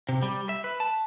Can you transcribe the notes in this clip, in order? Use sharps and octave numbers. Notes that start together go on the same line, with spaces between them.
C3
G3
E5
B4
A5